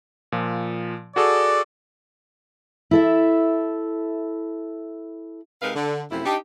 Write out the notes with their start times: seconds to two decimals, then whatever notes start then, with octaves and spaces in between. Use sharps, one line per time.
0.32 A#2 F3
1.16 F#4 G#4 A4 D5
2.91 E4 A4 E5
5.62 C3 G#3 D#4 A#4 B4 F5
5.75 D3
6.11 F#2 C3 F3 A3 E4
6.25 D4 D#4 G4